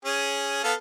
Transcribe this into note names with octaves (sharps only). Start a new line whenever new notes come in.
C#4 G#4
B3 A4 F5